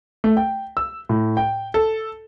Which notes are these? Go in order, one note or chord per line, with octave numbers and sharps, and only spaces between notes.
A3
G5
E6
A2
G5
A4